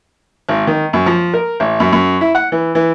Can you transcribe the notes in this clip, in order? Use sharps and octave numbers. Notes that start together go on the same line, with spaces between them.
G#1
D#3
F#2
F3
A#4
A1
F#2
F#2
E4
F#5
E3
E3